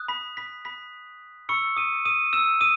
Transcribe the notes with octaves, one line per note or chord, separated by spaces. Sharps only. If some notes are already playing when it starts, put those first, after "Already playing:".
Already playing: D#6 F#6
B5 B6
B5 B6
B5 B6
B5 C#6 E6 C#7
D#6 D#7
D#6 D#7
E6 E7
D#6 D#7